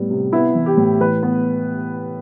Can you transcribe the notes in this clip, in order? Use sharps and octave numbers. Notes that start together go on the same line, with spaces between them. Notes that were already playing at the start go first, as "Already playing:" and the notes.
Already playing: A2 G3 B3
C3
B3 E4
E3
G4
A2
E3 B4
B3